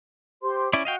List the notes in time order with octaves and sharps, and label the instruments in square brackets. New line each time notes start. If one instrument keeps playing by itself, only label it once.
[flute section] G4 C5 C6
[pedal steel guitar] C#4 E4 D5
[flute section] F#4 [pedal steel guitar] D#5 F5 G5